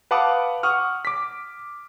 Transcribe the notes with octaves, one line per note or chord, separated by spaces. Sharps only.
B4 F5 F#5 A5 D6 D#6
F#5 C#6 D#6 F6
D6 B6